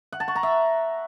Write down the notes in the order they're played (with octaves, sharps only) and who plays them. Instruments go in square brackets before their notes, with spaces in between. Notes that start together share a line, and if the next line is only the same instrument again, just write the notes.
[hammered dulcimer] F#5
A5
C#6
A#5
E5